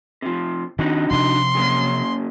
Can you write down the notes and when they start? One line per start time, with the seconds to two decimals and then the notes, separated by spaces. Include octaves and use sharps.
0.22 C3 F3
0.79 D#3 C4 D4 D#4 F#4
1.11 C3 F3 C6
1.55 C#3 F#3 A#3